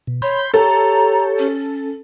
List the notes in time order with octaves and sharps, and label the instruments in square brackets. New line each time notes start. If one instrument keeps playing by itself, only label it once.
[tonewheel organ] B2
[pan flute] C#5 [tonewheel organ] B5 C6 G6
[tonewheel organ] G4 C#5 [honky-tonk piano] A4 [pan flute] A#5
[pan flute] C#4